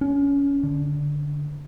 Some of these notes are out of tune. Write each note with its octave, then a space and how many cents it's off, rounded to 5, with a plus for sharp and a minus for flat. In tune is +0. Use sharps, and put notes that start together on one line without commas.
C#4 +20
D3 -5